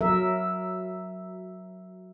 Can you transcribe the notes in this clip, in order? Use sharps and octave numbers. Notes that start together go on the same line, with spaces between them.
F#3 A#4 E5